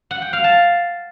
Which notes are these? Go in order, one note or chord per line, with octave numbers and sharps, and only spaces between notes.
F#5
G5
F5
A5